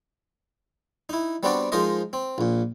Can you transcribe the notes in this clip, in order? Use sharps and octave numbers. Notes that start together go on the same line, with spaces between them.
D#4 E4
G3 B3 C4 D4 F#4 D5
F3 G#3 D#4 A#4 C5 D#5
C4
A#1 A#2